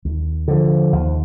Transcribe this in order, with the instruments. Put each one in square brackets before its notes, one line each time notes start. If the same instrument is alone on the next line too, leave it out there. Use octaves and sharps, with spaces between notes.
[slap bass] D#2
D3 F3
D#2